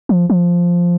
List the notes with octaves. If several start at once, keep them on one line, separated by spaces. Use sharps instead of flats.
F3
F3